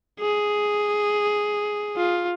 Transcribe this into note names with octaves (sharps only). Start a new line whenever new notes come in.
G#4
F4